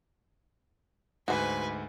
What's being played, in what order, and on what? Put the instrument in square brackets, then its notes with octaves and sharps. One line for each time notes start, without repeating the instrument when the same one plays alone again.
[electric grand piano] D2 G#2 [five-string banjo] F#4 C5 [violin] B4 G#5